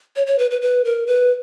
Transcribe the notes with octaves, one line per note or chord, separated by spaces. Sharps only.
C#5
C#5
B4
B4
B4
A#4
B4